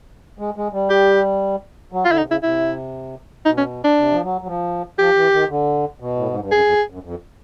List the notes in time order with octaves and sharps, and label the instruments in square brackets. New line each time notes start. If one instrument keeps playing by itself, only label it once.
[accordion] G#3
G#3
G3
[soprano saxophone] G4
[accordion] F#3
[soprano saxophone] F4
[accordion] D3 [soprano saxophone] E4
[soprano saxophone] D#4
[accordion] C3
[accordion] C#3 [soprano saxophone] E4
[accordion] C3 [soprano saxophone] E4
[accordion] B2 [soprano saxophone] D#4
[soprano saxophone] C#4
D4
[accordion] C3
F3
F#3
F#3
F3
[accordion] F3 [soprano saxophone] G4
[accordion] E3
D#3
D3
B2
A2
G#2
G2
[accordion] F#2 [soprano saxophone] G#4
[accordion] F2
F#2
F2